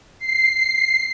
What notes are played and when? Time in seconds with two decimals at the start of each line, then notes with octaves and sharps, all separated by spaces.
0.18 C7